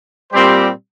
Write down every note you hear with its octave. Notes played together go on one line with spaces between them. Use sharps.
A#2 G3 C4 G4 C5